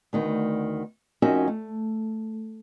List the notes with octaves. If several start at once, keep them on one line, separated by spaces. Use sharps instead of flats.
D2 D#3 B3
F2 C#4 D#4 F#4 A#4 E5
A3